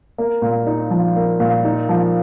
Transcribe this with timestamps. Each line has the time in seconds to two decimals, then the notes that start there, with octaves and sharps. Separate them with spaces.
0.18 A#3
0.42 A#2
0.67 D#4
0.91 F3
1.16 A#3
1.40 A#2
1.65 D#4
1.89 F3